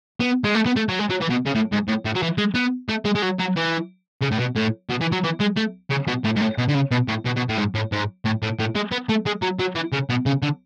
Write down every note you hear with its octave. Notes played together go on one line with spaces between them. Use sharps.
B3
G#3
A3
B3
A3
F#3
G#3
F#3
E3
B2
C#3
A2
G#2
A2
A2
F#3
E3
G#3
B3
A3
G#3
G#3
F#3
F#3
E3
C#3
A2
B2
A2
B2
E3
F#3
E3
G#3
A3
C#3
B2
A2
G#2
A2
B2
D3
C#3
B2
A2
B2
B2
A2
G#2
A2
G#2
A2
A2
A2
G#3
B3
A3
G#3
F#3
F#3
E3
C#3
B2
C#3
D3